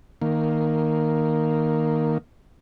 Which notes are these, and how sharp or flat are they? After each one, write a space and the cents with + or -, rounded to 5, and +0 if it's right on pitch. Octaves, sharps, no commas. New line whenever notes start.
D#3 +0 A#3 +0